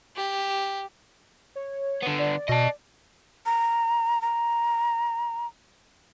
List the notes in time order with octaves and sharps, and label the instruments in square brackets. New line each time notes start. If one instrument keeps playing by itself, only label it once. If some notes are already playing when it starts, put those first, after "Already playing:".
[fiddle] G4
[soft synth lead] C#5
[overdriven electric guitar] D3 B3
[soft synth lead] D5
[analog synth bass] B2 [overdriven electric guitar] D#5 A5
[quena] A#5
A#5